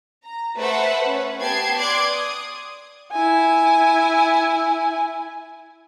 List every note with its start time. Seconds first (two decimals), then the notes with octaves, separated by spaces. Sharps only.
0.23 A#5
0.57 A3 B4 C5 E5 F#5 E6
1.06 C#4 B4
1.41 B3 G4 G5 A5 G#6 C7
1.78 D5 C6 D6 F#6 G#6
2.11 D#6
3.13 E4 G#5